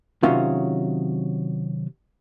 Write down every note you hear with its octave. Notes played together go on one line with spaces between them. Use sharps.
C3 D#3 F#3 C#4 F4 F#4